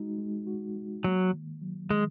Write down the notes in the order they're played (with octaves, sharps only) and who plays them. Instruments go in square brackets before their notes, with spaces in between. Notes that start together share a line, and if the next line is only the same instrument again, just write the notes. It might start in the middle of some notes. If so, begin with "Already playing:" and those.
Already playing: [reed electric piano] G#3 D#4 F#4
G#3
F#4
G#3
[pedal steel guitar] F#3 [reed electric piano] A#3
[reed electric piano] D#3
F#3
[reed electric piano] D#3 [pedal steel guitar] G#3